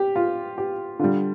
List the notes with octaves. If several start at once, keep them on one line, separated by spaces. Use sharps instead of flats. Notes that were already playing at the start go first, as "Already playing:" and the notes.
Already playing: G4
F4
G4
D3 G3 F4